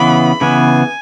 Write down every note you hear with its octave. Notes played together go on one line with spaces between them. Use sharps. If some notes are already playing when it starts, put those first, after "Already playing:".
Already playing: C#3 E3 B3 B5
C#3 E3 B3 G#5